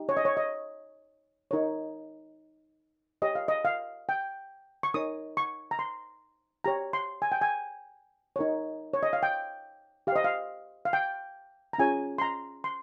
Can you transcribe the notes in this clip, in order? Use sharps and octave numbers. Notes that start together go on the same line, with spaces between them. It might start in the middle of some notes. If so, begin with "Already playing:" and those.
Already playing: D#4 G4
C#5
D#5
C#5
D#5
D#4 A#4 C#5
G4 C#5 D#5
F5
D#5
F5
G5
C#6
D#4 A#4 C#5 D#6
C#6
A#5
C6
G4 C#5 A#5
C6
G#5
G5
G#5
D#4 A#4 C#5
C#5
D#5
F5
G5
G4 F5
C5 D#5
F5
F5
G5
A#5
C#4 F4 G#4 C#5 G#5
C6
A#5
C6